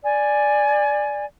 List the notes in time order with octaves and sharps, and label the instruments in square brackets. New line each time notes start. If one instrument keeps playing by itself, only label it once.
[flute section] D5 G#5